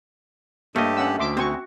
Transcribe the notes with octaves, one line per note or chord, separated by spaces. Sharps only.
G2 A3 A#3 G4 C#5 D#5
C#4 F#5 E6
D2 E5 C6 D6
C4 F#4 G#5 C#6